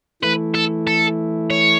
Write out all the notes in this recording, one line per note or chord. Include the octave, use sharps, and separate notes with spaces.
E3 A3 E4 B4
A4
A4
C#5